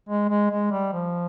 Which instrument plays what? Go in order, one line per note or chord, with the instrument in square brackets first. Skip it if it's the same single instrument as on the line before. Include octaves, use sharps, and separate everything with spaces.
[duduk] G#3
G#3
G#3
G3
F3